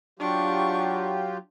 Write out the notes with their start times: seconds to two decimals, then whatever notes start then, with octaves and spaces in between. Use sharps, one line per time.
0.19 F#3 D4 F4 G4 C#6